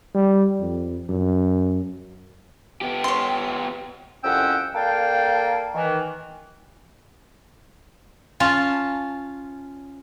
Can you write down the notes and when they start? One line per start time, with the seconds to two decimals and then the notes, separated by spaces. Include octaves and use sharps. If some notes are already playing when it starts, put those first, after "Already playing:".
0.15 G3
0.61 F2
1.09 F#2
2.81 B3 G4
3.04 C#5 C6
4.24 C2 F2 C#4 F#5 G5 E6
4.74 A#3 A4 D5 F5 G5
5.74 D#3 E3
8.40 C#4 F4 F5 A5